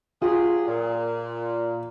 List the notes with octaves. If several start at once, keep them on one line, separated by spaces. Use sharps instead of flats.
F#3 F4 G4 G#4
A#2